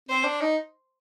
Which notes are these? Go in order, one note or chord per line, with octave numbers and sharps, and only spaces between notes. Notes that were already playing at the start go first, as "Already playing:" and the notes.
C4 C5
D4
D#4